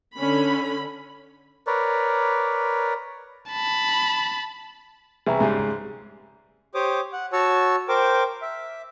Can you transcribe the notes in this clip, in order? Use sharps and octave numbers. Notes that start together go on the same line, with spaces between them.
D3 C#4 B5
A#4 B4 C#5 D5
A5 B5
C2 E3 G#4 E5 A#5
G#2 C#3 G3
G4 C5 C#5 D6 D#6
F#5
F#4 C#5 A5 C#6 E6
A#4 C5 G5 D6
E5